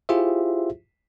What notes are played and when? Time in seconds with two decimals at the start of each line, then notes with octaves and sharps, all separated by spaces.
0.09 E4 F4 G4 G#4 C5 E5